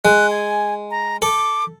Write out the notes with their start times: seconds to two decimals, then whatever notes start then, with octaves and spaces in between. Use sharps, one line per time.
0.05 G#3 F#6
0.31 G#5
0.91 A#5
1.22 A4 D6